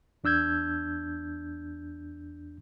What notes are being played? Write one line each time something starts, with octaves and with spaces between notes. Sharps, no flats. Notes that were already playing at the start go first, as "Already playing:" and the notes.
E2 D4 E6 G6 G#6